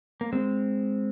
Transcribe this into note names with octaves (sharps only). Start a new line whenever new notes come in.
A#3
G#3 C4